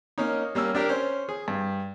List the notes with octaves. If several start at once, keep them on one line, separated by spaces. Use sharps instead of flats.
A#3 C#4 D#4
G3 A#3 C#4 E6
D4 G4 A#4
C#4 C5
G#4
G2